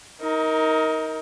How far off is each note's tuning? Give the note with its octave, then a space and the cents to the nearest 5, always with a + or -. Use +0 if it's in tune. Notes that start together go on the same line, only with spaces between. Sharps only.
D#4 +25 A#4 +0